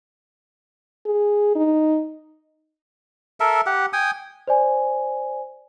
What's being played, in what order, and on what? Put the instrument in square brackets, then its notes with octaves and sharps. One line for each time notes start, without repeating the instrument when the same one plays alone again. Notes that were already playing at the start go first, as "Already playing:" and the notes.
[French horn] G#4
D#4
[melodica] A4 A#4 E5
G4 F#5
G5 G#5 D#6
[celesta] C5 D5 G#5